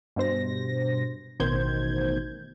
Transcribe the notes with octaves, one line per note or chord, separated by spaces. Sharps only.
G2 B2 C5 A#6
A1 B2 D#3 C5 G6 G#6